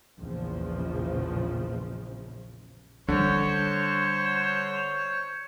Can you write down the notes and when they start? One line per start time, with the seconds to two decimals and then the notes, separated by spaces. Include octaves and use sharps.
0.19 A#1 E2 C#3 F3
3.08 D3 G3 D4 C5 C#5